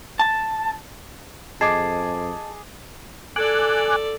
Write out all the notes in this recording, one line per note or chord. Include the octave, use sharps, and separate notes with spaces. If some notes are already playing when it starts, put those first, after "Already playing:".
A5
F2 G#4 D#5 A5 D6 G#6 C7
A4 D5 G#5 D6 F#6